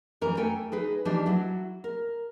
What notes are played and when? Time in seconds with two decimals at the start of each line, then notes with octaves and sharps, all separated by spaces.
0.21 F#2 E3 C#4 A#4
0.37 A3 A4 G5 G#5
0.72 D#4 G#4 B4
1.05 E3 F3 G3 D4 D#4
1.26 F#3 E4
1.84 A#4